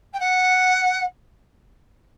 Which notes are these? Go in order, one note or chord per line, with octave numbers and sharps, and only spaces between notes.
G5
F#5